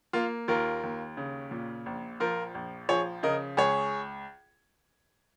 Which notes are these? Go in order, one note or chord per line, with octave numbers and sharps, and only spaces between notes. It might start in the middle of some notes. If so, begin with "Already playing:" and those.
A#3 F4
D#2 F4 A#4
D#2
C#3
A#2
A#1
F3 F4 A#4
A#1
F3 G#4 C#5
C#3 A#4 D#5
C#2 G#4 C#5